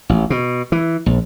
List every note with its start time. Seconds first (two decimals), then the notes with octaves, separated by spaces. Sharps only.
0.09 A1
0.30 B2
0.72 E3
1.06 A#1